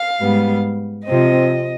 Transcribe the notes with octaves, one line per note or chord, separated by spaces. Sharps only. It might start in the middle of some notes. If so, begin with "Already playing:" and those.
Already playing: F5
G#2 G3 B3
C3 F3 C4 D#5